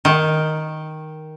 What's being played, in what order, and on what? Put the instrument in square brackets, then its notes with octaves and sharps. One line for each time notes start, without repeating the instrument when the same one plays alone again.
[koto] D#3